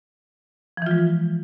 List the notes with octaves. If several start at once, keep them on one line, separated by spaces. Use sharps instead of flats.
E3 F3 G#3 F4